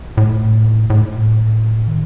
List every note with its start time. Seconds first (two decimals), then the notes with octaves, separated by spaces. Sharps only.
0.17 A2
0.90 A2
1.88 D#3